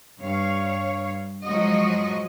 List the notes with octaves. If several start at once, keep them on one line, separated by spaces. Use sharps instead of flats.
G2 C#5 F5
F3 F#3 G#3 F#4 D#5